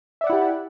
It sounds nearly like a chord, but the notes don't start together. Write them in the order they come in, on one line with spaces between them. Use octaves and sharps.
E5 D5 F#5 E4 G4